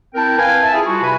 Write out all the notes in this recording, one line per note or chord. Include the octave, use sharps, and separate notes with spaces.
C4 E4 A#4 G5 A5
B4 F5 G5 G#5
E5 A5
E4 F4 G#4
G3 F4 F#4
C3 B4 G#5 B5